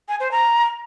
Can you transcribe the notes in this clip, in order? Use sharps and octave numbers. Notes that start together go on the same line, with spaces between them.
G#5
C5
A#5